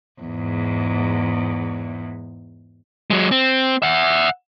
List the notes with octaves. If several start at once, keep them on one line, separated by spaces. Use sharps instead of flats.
E2 G#2
F#3 G#3
C4
E5 F#5